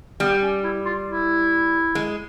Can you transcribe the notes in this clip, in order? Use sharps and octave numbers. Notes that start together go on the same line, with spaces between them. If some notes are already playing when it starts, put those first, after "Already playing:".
G3 B3
C#4
E4
F4
E4
G#3